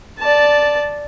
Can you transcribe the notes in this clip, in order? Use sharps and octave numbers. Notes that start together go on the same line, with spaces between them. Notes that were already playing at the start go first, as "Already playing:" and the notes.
D5 A5